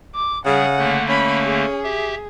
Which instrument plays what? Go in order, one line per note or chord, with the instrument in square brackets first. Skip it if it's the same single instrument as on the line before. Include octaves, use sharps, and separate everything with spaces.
[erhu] D6
[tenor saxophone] C#3 [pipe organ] G3 G#4 [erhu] F#5
[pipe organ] D3 A3 A#3
[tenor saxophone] C#4 [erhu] B5
[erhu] G#4
[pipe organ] G4 E5